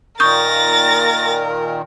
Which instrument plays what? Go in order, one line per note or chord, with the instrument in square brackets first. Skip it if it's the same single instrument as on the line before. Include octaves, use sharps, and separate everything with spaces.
[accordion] A#2 D#3 [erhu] A#4 [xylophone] C#6 D#6 G6 [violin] A6 A#6